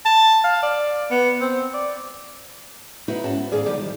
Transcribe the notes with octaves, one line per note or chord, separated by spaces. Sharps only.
A5
F5
D5
B3
C4
D5
D#4 E4 F#4 B4
G#2 C#4 F#4 A5
B3
D2 G#2 D#3 G#4 D5 F5
D3 F3 G3 D#4 G4 D5
D#3 F3 G3